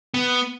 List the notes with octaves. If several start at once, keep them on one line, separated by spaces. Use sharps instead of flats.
B3